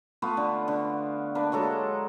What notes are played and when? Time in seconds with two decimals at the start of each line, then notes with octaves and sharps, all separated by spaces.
0.22 A3 B3 F4 B4
0.37 D3
0.68 D3
1.35 A#3 D4 B4
1.52 F#3 G#3 A4 A#5